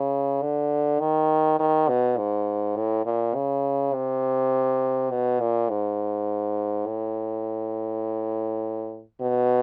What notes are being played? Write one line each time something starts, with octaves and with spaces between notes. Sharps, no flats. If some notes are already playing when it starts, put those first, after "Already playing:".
Already playing: C#3
D3
D#3
D#3
B2
G#2
A2
A#2
C#3
C3
B2
A#2
G#2
A2
B2